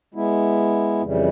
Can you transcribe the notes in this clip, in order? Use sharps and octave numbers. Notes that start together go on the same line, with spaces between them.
G#3 B3 E4
F2 C#3 E3 G3